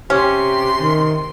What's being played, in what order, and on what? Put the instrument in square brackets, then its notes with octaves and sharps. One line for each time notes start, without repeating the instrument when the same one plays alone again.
[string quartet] C3 C6 [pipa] C#4 [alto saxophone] G4
[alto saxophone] D#3